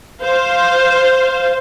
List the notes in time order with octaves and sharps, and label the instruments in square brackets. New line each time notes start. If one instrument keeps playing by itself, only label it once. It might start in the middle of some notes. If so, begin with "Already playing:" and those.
[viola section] C5 F5